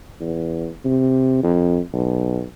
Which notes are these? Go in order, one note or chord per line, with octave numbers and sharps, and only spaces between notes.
E2
C3
F2
B1